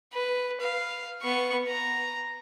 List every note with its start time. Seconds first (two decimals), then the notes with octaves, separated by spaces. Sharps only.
0.13 B4
0.61 F5
1.22 B3 C#6
1.68 A#5